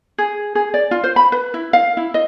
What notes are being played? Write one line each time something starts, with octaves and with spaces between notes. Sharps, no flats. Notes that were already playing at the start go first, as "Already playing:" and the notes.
G#4
G#4
D5
F4
C5
B5
B4
E4
F5
E4
D#5